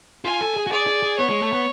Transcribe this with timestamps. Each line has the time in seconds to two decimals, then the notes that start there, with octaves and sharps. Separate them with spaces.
0.25 F4 G#5
0.41 A4
0.57 G#4
0.67 F#4
0.71 G#4 D5
0.87 G#4
1.03 G#4
1.18 B3 C#5
1.29 G#3
1.42 A3
1.53 B3